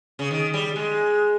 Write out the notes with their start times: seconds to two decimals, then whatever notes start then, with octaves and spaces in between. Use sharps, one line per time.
0.19 C#3
0.31 D#3
0.54 G3
0.76 G#3